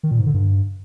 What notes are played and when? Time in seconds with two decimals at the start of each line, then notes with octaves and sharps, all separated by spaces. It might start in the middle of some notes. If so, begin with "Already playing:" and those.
0.03 D#3
0.11 A#2
0.19 G#2
0.26 D3
0.34 G2